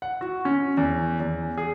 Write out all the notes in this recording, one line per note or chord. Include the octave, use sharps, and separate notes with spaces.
F#5
F#4
C#4
E2
E2
G#4